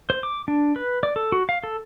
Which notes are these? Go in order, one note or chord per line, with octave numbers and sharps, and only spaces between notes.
C5
D6
D4
B4
D5
A4
F#4
F5
A4